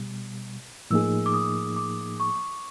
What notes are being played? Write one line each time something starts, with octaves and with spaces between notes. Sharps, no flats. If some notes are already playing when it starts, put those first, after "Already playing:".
Already playing: B2 G3
A2 F3 A#3 D#4 G#4 E6
D6
D#6
D6
C#6